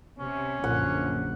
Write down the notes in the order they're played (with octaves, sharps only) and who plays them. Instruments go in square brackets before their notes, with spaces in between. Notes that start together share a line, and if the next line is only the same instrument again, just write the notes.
[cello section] C3 [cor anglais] C#4
[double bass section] A#1 [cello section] F#2 D3 [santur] F#5